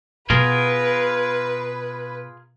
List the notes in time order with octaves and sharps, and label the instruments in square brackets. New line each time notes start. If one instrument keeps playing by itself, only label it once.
[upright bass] B2 [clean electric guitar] F4 G#4 A#4 [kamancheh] B4